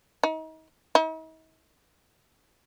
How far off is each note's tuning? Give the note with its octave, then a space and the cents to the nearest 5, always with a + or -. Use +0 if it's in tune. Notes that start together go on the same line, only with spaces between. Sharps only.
D#4 +35
D#4 +45